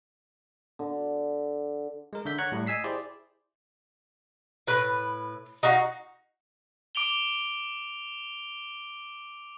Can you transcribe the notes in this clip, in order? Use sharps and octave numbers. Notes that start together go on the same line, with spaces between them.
D3
G#3 A#4
D3 E5 G6 B6
C#5 F#5 A#5 F#6 G#6 C#7
A2 G3
D#5 G#5 E6 B6 C7
E4 G4 G#4 C5 D5
A2 B4
D#4 F#4 F5
D6 D7 F7 G7